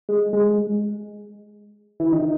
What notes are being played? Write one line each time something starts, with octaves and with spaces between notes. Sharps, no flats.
G#3
G#3
E3
D#3